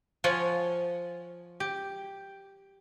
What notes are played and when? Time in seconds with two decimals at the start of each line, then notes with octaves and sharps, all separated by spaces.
0.24 F3 F4 C#5 F#5 G#5
1.60 G4